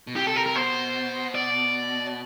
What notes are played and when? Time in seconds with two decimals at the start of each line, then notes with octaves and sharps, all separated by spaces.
0.07 B2
0.16 C3 G4
0.27 A4
0.36 A#4
0.46 A#4
0.56 B2 C5
1.35 D5